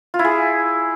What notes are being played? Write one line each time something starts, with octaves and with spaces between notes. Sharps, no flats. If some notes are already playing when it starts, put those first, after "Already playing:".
F4
E4
G#4